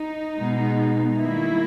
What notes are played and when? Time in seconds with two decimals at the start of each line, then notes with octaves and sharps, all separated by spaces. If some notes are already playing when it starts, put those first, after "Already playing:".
Already playing: D#4
0.38 B2 G#3 B3
1.20 D#3 G3 A#3 E4